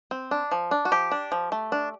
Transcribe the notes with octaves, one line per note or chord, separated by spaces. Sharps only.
C4
D4
F3
D4
F#4
F3 G4
D4
F3
A3
D4